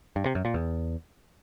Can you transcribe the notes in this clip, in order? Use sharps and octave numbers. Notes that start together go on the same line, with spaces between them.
G2
C3
F#2
A#2
E2